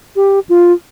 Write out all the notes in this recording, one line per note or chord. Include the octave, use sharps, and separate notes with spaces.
G4
F4